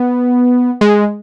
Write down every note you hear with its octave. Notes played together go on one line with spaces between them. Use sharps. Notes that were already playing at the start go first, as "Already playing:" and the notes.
Already playing: B3
G#3